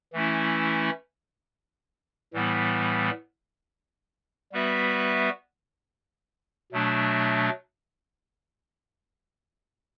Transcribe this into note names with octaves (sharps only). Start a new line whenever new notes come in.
E3 A3 C#4 E4
A2 E3 G3 B3
G3 B3 F#4 B4 E5
B2 F#3 A3 D4